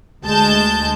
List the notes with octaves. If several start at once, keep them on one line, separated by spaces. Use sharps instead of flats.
D2 G#3 A5 G6